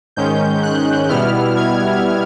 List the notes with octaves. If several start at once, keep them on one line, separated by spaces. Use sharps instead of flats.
G#2 D#3 G#3 C#4 G6
F#6
B2 G3 B3 E4 F6
G#6